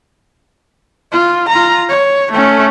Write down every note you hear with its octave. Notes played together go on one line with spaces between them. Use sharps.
F4
F4 A#5
C#5
A3 C#4